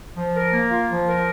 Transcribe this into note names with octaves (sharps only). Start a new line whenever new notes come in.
F3
A#4
A#3
F4
F3
A#4